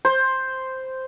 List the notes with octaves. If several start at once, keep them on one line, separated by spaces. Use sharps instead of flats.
C5